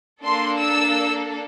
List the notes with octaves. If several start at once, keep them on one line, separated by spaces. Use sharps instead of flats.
A#3 D4 A4 C6
E6